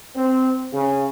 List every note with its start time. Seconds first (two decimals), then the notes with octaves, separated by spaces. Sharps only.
0.15 C4
0.72 C#3